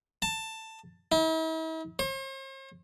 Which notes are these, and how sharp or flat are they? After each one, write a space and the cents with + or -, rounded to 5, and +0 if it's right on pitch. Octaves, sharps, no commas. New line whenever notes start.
A5 +15
E4 -45
C5 +45